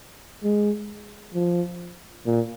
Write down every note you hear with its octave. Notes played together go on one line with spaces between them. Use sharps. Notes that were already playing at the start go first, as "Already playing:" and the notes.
G#3
F3
A#2